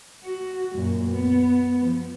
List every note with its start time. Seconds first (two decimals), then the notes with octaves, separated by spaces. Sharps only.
0.24 F#4
0.74 F#2 A#2
1.11 B3
1.85 F3